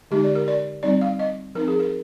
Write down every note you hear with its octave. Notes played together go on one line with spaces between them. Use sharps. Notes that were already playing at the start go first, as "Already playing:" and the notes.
D3 G#3 D#4 G4
D5
A#4
D5
G3 C4 D#4 D5
F5
D#5
F3 C4 D#4 A#4
G#4
A#4